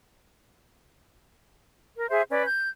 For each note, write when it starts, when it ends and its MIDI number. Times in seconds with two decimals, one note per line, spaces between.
1.97 2.10 70
2.10 2.23 68
2.10 2.23 72
2.10 2.23 76
2.30 2.45 61
2.30 2.45 71
2.30 2.45 74
2.45 2.68 91